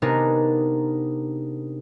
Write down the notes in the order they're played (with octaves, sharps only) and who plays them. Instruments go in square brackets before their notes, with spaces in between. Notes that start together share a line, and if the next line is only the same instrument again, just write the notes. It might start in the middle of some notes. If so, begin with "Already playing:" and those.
[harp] C3 B3 D4 D#4 G#4 A#4